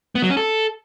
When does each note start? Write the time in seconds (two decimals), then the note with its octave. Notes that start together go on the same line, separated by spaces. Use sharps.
0.15 B3
0.22 F#3
0.30 C#4
0.37 A4